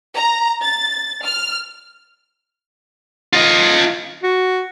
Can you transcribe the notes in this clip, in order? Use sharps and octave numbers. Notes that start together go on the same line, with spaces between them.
A#5
A6
F6
F4 D#5
F#4